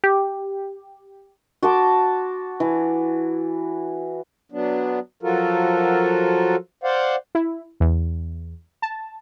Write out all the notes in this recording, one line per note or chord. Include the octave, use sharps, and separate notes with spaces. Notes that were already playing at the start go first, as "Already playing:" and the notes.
G4
F#4 A5 C6 D6
E3
F#3 B3 D4
F3 F#3 F4 F#4 A4 A#4
C5 D5 F5 F#5
E4
E2
A5